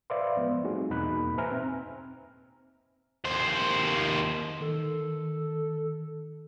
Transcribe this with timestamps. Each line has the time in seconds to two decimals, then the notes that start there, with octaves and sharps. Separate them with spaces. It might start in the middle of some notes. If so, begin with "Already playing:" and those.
0.10 B4 C5 D5 E5 F5 C6
0.36 F3 G#3 B3
0.63 G3 A3 C4 D#4 F#4 G#4
0.90 E2 B2 A#3 D#4 B5 F#6
1.38 B4 C5 E5 G#5 A#5 F6
1.51 C4
3.25 D#2 C5
4.61 D#3 A4